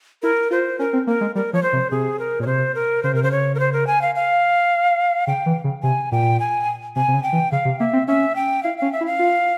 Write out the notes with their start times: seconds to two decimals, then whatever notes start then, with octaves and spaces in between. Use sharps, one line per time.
0.23 E4 A#4
0.51 F4 C5
0.79 C#4 A#4
0.93 C4
1.07 A#3 A#4
1.21 G#3
1.35 G3 A#4
1.53 F3 C#5
1.63 C5
1.73 C3
1.91 C3 G#4
2.19 A#4
2.39 A#2
2.42 C#5
2.46 C3 C5
2.75 A#4
3.03 C#3 C5
3.14 C3 A#4
3.23 C#3 C5
3.32 C#5
3.55 A#4
3.59 C5
3.73 A#4
3.87 G#5
4.02 F5
4.15 F5
5.27 C#3 G5
5.46 E3
5.64 C#3
5.83 C3 G#5
6.12 A#2 G5
6.40 G#5
6.96 C3 G#5
7.08 C3
7.14 C#3
7.23 G5
7.33 E3
7.52 C#3 F5
7.65 C3
7.79 A#3 E5
7.93 C4
8.07 C#4 E5
8.36 G5
8.63 E4 F5
8.78 C#4 F5
8.92 E5
9.01 E4
9.06 F5
9.19 F4